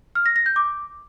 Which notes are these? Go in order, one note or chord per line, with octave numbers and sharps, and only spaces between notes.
F6
A#6
A#6
G6
D6